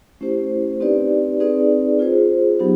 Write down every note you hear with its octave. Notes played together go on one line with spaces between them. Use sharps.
A3 C#4 E4 G4 C5
C4 D#4 G4 B4 D5
C4 D#4 G#4 B4 D5
F4 G#4 C5
F#3 B3 D#4 G4